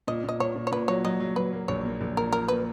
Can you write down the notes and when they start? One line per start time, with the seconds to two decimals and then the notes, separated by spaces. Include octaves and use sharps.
0.07 A#2 D#5
0.24 A#2 D#5
0.40 A#2 C#5
0.56 A#2
0.67 C#5
0.72 A#2 B4
0.88 F#3 C#5
1.04 F#3 D#5
1.20 F#3
1.36 F#3 B4
1.52 A#3
1.68 A#1 C#5
1.85 A#3
2.01 A#1
2.17 A#2 A#4
2.32 A#2 A#4
2.48 A#3 B4